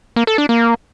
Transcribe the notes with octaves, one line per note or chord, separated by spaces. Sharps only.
A#3
A4
D4
A#3